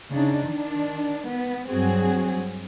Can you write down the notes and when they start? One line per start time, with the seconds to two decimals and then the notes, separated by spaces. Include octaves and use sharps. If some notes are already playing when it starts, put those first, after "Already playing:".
0.11 C#3 D4 D#4
0.48 D#3 D4
1.29 B3
1.68 G2 F#3 C4 F#4 G#4